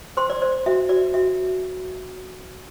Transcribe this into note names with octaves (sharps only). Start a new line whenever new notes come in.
C5 C6
D5
C5 D5
F#4 E5
F#4 D5
F#4 E5